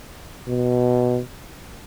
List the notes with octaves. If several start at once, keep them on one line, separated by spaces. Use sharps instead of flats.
B2